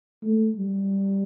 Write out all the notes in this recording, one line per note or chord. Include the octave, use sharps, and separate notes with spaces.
A3
G3